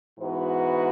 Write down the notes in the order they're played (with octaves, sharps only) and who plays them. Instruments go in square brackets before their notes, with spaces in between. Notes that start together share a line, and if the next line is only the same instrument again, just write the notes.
[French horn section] G#2 E3 B3 F#4 B4